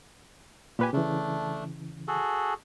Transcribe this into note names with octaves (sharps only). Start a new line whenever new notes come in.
A#2 G4 B4 G#5
C#3 E3 A3 D4
F#4 G#4 A4